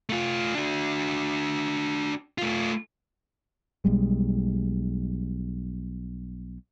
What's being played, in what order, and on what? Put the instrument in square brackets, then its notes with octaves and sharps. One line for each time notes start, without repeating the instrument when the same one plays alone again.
[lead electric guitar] A3 F4
D4 F#4
A3 F4
[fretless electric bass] B1 G3 G#3